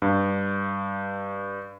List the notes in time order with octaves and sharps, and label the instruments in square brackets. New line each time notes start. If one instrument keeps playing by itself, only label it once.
[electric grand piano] G2